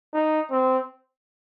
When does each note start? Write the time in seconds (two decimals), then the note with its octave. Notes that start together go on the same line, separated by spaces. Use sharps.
0.14 D#4
0.51 C4